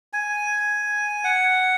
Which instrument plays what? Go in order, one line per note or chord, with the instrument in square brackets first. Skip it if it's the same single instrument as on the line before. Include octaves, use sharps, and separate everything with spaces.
[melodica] G#5
F#5